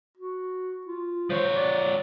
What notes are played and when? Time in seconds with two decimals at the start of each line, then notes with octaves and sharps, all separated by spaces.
0.18 F#4
0.87 F4
1.30 F3 C5 C#5
1.56 D5